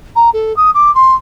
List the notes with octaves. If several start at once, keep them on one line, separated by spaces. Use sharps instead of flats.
A#5
A4
D#6
D6
C6